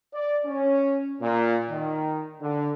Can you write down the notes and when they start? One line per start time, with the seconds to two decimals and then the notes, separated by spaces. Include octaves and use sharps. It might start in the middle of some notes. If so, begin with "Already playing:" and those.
0.14 D5
0.45 C#4
1.21 A#2
1.70 D#3
2.41 D3